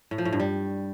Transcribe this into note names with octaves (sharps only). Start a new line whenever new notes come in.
A2
F3
A2
G2
G3